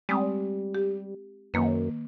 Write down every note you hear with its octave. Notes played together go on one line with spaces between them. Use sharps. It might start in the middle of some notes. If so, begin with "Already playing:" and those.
G3 G#3 C4 D#6
G4
F#2 D#3 A#3 B4